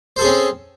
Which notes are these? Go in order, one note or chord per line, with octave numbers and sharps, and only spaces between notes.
C4 C#4 G#4 A4 C5